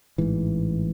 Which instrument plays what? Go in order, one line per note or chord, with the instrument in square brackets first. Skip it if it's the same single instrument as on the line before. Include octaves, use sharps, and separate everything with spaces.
[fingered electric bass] A1 G#2 E3